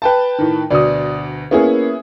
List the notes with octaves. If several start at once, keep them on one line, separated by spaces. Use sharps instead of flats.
B4 G5 A5
A2 D#3
D2 B2 D5 D#6
A#3 B3 C#4 E4 G#4 C#5